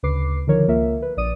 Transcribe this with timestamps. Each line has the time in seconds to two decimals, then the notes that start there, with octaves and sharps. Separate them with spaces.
0.03 D2 C#3 B4 D6 C7
0.47 D3 D#3 F3 A#4 C#5
0.68 C#2 A#3 F4 A#4 E5
1.02 B4
1.17 A#1 D5 D#6 D#7